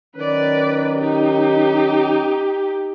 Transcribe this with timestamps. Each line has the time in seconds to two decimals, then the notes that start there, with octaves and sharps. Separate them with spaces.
0.15 D#3 F#3 C#4 B4 D5
0.99 D#4 G4